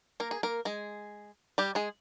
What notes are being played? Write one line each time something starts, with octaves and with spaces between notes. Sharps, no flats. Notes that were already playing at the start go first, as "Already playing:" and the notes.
A#3 A#4
G#4
A#3 A#4
G#3 G#4
G3 G4
G#3 G#4